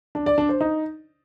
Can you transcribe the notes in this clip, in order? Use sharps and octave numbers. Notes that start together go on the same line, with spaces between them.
D4
D5
D4
C5
D#4